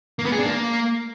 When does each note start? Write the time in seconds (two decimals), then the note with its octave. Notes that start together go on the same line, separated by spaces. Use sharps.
0.19 A#3
0.25 B3
0.32 G#4
0.39 D4
0.45 A#3